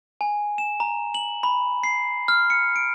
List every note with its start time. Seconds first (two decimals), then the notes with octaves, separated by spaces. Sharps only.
0.21 G#5
0.58 E7
0.80 A#5
1.14 F#7
1.43 B5
1.84 C7
2.28 F6
2.50 C#7
2.76 D7